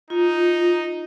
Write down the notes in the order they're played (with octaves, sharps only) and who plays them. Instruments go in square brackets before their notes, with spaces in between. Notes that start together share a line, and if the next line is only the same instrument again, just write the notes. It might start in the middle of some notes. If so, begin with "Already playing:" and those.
[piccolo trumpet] D#4 [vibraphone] F4